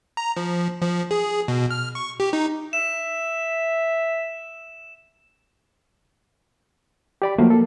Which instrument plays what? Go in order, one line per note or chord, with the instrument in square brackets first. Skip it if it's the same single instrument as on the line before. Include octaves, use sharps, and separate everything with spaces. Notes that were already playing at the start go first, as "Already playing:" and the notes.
[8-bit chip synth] A#5
F3
F3
G#4
B2
F6
C#6
G4
D#4
[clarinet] E5 [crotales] E7
[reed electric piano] G4 D5 B5
[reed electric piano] F3 F#3 A3 [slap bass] A#3
[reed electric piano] A4